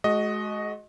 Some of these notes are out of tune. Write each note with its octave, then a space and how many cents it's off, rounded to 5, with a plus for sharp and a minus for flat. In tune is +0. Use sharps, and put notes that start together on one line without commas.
G#3 +35 F#4 +0 D#5 +0